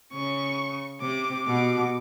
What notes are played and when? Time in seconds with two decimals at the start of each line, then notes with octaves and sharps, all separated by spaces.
0.12 C#3 C#6
1.01 C3 D6
1.46 B2 D6